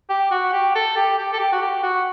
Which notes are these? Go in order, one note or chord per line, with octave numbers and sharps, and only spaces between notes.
G4
F#4
G4
A4
G4
G4
A4
G4
F#4
G4
F#4